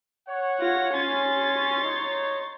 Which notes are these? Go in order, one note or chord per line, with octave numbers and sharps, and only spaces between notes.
C#5 F#5
F4 A#6
C#4 C6 A6
D#4 C#5